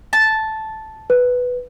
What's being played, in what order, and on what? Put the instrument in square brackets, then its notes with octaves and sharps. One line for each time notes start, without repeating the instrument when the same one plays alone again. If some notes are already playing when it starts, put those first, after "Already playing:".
[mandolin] A5
[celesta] B4